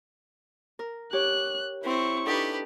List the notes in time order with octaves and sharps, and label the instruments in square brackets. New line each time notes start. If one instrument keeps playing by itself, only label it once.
[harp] A#4
[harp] G4 C#5 [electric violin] F#6
[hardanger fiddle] C4 [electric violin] E4 C#6
[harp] D4 D#4 A4 [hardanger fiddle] G4 B4